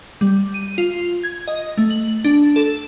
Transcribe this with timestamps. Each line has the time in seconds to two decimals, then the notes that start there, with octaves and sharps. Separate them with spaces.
0.21 G3
0.54 D#7
0.78 F4
1.23 G#6
1.47 D#5
1.77 A3
1.90 F#7
2.25 D4
2.56 A4